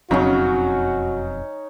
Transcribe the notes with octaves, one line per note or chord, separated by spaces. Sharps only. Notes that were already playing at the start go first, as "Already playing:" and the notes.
E1 F2 C#3 F#3 C4 C#4 D#4 F#4